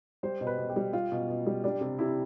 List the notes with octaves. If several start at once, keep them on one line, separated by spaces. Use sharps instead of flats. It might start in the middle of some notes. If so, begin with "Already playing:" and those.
G3 C5
B2
B4
B2
G4
G3
G3 F4
B2
B2
G3
G3 D4
C3
C3 E4